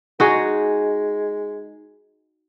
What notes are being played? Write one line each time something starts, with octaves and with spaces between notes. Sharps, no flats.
G#3 D#4 F#4 G#4